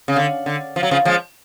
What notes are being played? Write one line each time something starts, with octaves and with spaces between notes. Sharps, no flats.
C#3
D3
D3
F3
F#3
C#3 F3
F3 G#3